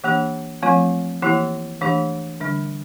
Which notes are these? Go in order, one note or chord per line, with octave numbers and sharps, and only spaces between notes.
E3 A#3 D4 G4
F3 A3 C4 F4
E3 A#3 E4 G4
E3 A3 D4 G4
D3 G3 D4